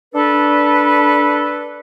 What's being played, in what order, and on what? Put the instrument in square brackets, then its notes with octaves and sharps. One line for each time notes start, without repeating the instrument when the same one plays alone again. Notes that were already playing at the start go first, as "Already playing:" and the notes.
[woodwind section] D4 A4 B4